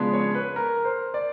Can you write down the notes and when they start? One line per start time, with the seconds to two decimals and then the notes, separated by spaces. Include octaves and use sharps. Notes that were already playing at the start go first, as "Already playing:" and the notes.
Already playing: C#3 F3 G#3 B3 D4
0.13 C#5
0.35 B4
0.56 A#4
0.85 C5
1.14 D5